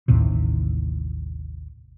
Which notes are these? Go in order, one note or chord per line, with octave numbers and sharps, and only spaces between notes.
A1 D#2 A2 C3